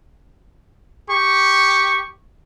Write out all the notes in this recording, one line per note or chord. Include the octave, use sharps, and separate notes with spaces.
G4 C#6